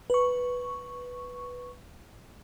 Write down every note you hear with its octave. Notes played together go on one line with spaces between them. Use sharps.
B4 C#6